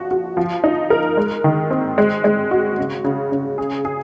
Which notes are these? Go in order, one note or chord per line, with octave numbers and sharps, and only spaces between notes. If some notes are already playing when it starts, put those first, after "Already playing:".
Already playing: F3 F#4
F#4
F3
D#4
A#4
G#3
D#3
C4
G#3
G#3
F#4
C#3
C#3
C#3
G#4
G#4